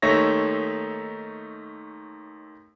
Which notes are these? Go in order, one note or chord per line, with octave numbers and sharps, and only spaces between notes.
D#2 A3 D#4 C#5 E5 A#6